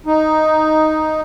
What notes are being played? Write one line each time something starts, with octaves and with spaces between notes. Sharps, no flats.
D#4